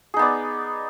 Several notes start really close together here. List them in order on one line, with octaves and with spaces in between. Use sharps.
G#4 D#4 B3 D5